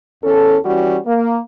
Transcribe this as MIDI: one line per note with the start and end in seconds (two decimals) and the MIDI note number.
0.23 0.57 40
0.23 0.57 61
0.23 0.57 69
0.64 0.96 52
0.64 0.96 55
0.64 0.96 61
0.64 0.96 66
1.06 1.38 58